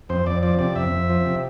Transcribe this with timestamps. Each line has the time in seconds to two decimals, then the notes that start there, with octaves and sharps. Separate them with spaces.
0.09 F2 C5
0.26 F2 D5
0.43 F3 D5
0.59 C3 D5
0.75 F2 E5
0.92 F2
1.10 F3
1.26 C3